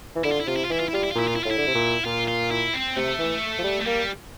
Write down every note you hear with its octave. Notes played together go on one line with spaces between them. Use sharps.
E3
D3 E4
F4
E4
C3 F4
E4
F4
E3 E4
F4
E4
G3 F4
E4
F4
A#2 E4
F4
E4
A2 F4
E4
D3
C3
A#2
A#2 F4
F4
E4
C4
C3 A3
E3
F3
G3
A3
G3 A#3